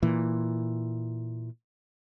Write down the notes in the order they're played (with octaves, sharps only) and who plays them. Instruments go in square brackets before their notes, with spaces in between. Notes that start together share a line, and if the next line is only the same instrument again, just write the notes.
[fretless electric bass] A#2 E3